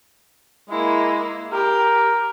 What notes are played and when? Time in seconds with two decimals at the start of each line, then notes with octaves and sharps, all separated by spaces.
0.69 G#3 A#3 E4
1.52 G4 A#4